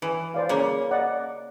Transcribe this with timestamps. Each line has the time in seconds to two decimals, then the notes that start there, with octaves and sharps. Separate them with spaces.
0.02 E3 G#5
0.34 C5 D5 F5
0.49 C#3 A#3
0.91 D5 D#5 F#5